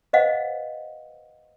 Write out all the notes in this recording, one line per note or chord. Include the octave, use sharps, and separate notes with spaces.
B4 C5 D#5 F5 F#5